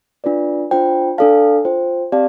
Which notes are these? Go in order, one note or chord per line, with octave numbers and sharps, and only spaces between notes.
D4 F4 B4 D5
D4 F4 C5 G5
D4 A4 D5 F5 A5
F4 C5 G5
C4 G4 D5 F5 A5